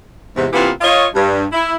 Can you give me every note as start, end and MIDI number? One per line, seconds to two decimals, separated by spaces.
0.35 0.46 40
0.35 0.46 44
0.35 0.46 48
0.53 0.70 48
0.53 0.70 52
0.53 0.70 58
0.53 0.70 59
0.53 0.70 65
0.53 0.70 67
0.81 1.06 65
0.81 1.06 73
0.81 1.06 75
1.15 1.44 43
1.53 1.76 64